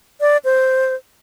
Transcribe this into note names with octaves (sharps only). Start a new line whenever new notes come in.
D5
C5